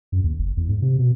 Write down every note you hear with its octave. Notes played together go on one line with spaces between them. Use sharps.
F#2
D#2
F#1
E2
G#2
C3
B2